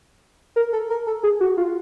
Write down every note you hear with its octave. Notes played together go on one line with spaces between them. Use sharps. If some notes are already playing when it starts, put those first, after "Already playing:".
A#4
A4
A#4
A4
G#4
F#4
F4